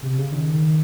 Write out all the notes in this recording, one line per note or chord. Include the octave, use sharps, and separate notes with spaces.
C3
C#3
D#3